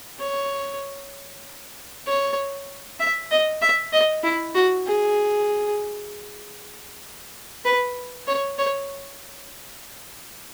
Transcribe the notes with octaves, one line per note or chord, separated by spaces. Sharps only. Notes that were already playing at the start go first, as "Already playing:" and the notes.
C#5
C#5
E5
D#5
E5
D#5
E4
F#4
G#4
B4
C#5
C#5